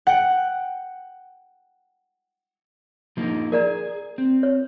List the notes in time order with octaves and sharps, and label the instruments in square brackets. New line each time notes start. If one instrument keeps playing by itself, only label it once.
[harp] F#5 G5
[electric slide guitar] F3 A#3 D#4
[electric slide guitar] G#4 [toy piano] A#4 D5 A#5
[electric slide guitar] C4
[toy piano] C#5